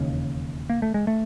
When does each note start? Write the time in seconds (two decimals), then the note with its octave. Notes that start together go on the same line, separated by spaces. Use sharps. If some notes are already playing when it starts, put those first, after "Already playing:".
Already playing: E1 D#2 C#3
0.70 A#3
0.82 A3
0.94 G#3
1.07 A3